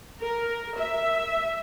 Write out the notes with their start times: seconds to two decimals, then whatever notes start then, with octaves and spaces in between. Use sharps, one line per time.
0.21 A#4
0.79 E5